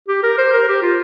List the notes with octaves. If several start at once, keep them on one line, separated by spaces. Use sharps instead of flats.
G4
A#4
C5
A#4
G4
F4